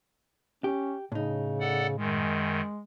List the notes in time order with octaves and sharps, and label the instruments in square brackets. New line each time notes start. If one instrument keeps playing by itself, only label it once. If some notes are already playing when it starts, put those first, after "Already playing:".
[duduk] C#4 [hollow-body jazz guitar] G4
[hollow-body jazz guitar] A2 D#4 [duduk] C#3
[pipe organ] A4 D5 F#5
[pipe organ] F#2 D#3 [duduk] G#3